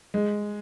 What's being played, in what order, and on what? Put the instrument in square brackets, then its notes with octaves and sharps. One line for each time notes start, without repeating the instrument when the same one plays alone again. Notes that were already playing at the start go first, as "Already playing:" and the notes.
[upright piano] G#3